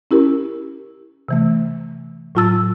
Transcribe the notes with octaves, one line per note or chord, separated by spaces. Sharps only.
C#4 E4 G4 A#4
C3 E3 A3
A2 F#3 F4 A5 E6 A6